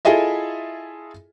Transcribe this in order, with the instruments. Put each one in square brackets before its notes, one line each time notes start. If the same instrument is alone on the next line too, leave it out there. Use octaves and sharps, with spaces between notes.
[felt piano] E4 F4 G#4 A4 D#5 E5